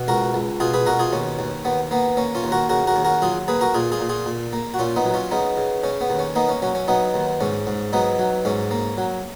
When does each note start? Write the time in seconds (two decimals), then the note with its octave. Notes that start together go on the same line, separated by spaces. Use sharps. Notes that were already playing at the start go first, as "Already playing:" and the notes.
Already playing: B2
0.08 C#2 F#4 A#4
0.34 C#2
0.60 B2 F4 G#4
0.74 G#4 B4
0.86 B2 F#4 A#4
0.99 F4 G#4
1.13 D#2 C#4
1.39 D#2
1.65 D#2 B3
1.91 A#3 B3
2.17 A#3 C#4
2.35 C#4 F4
2.44 D#2
2.52 F#4 A#4
2.69 C#3 F#4 A#4
2.87 F#4 A#4
2.96 D#2
3.04 F#4 A#4
3.22 F#3 F4 G#4
3.48 A#3 G#4 B4
3.61 F#4 A#4
3.74 A#2 F4 G#4
3.92 F4 G#4
4.01 A#2
4.09 F4 G#4
4.26 A#2
4.53 A#3
4.74 F#4
4.79 A#2 C#4 F4
4.96 B3 D#4
5.05 F#3
5.14 C#4 F4
5.31 C#3 B3 D#4
5.57 C#3
5.84 C#3 C#4
6.01 B3
6.10 D#2
6.19 C#4
6.35 A#3 B3 D#4
6.49 C#4
6.62 F#3 C#4
6.75 C#4
6.88 F#3 B3 D#4
7.14 D#2
7.41 G#2 C#4
7.67 G#2
7.93 F#3 B3 D#4
8.19 F#3
8.45 G#2 C#4
8.71 A#3
8.98 F#3